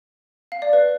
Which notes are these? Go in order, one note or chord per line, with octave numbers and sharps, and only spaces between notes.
F5
D5
B4